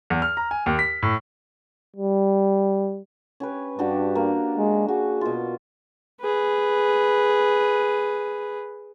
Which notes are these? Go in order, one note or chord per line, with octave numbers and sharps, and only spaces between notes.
E2
F6
A#5
G#5
D#2
B6
A2
G3
C#4 G4 B4
G2 D4 F#4 G4
A#3
G#3
F#4 G#4
B2 F4
G#4 B4